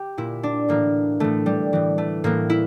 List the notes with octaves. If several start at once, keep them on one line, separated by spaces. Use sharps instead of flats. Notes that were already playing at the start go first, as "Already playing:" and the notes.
Already playing: G4
A#2 E4
D4
A2 E3 A#3
A2 E3 A3
G3
A2 E3
A3
A2 E3 A#3
E4